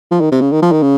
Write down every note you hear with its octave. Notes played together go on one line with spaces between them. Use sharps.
F3
D#3
C3
C#3
D#3
F3
D#3
C#3